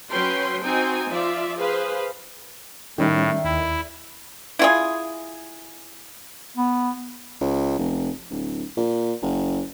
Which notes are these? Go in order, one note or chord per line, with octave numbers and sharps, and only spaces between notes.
F#3 C#4 B4 G5 C6
C4 D#4 F#4 G5 G#5
F3 F4 D5 E5
G#4 B4 C5 F5
A2 D#3 G3 C#4 D#4 A4 D5 E5
D#2 E4
E4 F4 G#4
B3
C#2
F1
D1
A#2
F#1